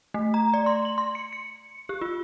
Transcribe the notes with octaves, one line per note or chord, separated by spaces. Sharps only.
A3
A#5
D5
C6
F#7
C6
C#7
C#7
G4
F4